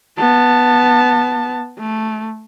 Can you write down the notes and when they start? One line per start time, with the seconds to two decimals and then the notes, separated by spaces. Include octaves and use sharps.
0.18 B3 A5
1.79 A3